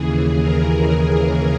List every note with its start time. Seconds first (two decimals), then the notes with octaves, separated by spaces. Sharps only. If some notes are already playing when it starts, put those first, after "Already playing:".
Already playing: D#2 C#3 E3 G#4
0.38 A#4